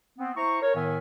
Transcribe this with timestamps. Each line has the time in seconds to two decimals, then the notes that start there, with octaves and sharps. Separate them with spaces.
0.17 B3 C4
0.36 E4 C5 A#5 C#6
0.61 A#4 C#5
0.75 A2 D#3 B3 A#4 E5 G#5